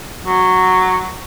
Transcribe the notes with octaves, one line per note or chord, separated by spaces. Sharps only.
F#3